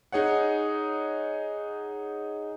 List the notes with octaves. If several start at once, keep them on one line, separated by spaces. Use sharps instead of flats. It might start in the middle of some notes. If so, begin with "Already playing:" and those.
D#4 G#4 C#5 F#5